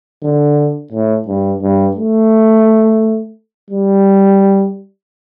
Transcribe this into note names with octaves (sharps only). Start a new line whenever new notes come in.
D3
A2
G2
G2
A3
G3